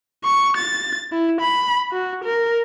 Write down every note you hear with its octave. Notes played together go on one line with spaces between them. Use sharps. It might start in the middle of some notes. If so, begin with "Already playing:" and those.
C#6
A6
E4
B5
F#4
A#4